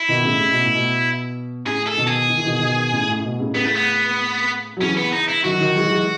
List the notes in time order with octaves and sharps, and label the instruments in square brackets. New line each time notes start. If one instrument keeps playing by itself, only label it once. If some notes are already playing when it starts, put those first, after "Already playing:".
Already playing: [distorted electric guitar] E4
[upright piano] B2 D#3
A2 C#3
C#3
B2
A2
B2
[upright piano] A2 C#3 [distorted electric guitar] G#4
[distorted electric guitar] A4
[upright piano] B2 D#3
[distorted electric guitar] G#4
[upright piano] D#3
E3
B2 D#3
B2 D#3
A2 C#3
A2
A2
B2
A2 C#3
[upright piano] A2 C#3 [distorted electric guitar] B3
[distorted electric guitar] A3
B3
[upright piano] F#3
[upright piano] C#3 E3 [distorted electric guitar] C#4
[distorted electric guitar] B3
D#4
E4
[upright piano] D#3 F#3 [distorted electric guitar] F#4
[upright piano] D#3 F#3
E3 G#3
F#3
E3 G#3